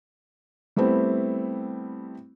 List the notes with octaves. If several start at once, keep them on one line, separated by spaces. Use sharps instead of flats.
G3 A3 B3 C4 E4